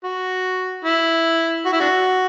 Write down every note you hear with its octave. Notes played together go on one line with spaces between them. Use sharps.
F#4
E4
F#4
E4
D4 F#4